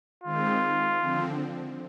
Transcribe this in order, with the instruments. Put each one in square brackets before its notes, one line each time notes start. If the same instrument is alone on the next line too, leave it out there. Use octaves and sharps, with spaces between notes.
[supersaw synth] D#3 G#3 C4 [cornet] F4
[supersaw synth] D3 F3 C4